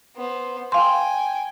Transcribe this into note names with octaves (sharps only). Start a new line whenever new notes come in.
B3 C5
F5 G5 G#5 C6